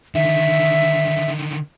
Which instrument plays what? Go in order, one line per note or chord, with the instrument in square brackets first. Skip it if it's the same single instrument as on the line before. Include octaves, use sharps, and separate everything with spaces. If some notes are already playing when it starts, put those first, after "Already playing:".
[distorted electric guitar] D3 D#3 [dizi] E5